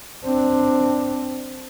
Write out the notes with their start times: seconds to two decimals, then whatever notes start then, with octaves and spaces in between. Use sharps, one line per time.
0.25 C4 D4